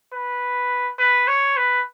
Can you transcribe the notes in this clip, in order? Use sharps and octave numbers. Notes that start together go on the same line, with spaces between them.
B4
B4
C#5
B4